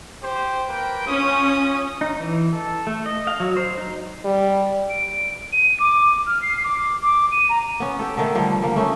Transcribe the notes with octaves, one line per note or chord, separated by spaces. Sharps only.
G4 C5
A#3 B4 G5
C#4 F4 D#6
D#4
E3
A4
A3
D#5
F5
F#3
C5
D#4
G3
D7
D#7
D6
F6
C7
D6
D6
D#7
A#5
B3 C#4
G4 A4
D3 D#3 A3
D3 F3 G3
G3 A#3
A3 C#4 D#4